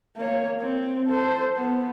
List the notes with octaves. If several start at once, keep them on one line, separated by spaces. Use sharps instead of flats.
A#3 C#5
C4
A4 C5
B3